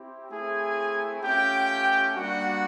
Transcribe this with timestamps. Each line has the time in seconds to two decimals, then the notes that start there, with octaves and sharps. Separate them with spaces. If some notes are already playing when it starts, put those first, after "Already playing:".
Already playing: C4 E4 G4
0.31 A3 C4 E4 G#4 G#5
1.22 A3 C#4 F4 G4 G5
2.14 G3 A#3 D4 F#4 F#5